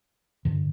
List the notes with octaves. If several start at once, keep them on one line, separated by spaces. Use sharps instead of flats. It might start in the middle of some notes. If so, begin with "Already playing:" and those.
G2 D3